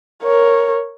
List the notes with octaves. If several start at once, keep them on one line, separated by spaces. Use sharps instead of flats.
A#4 C#5